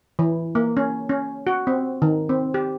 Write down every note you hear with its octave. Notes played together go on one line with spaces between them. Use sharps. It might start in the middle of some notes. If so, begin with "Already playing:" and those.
E3
A#3
C#4
C#4
F#4
C4
D#3
C4
G4